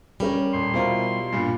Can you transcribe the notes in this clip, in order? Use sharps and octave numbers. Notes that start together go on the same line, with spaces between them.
G3 C#4 A#4 C#5
D#1 C6
B2 E4 F4 A#4 C5
G2 A#2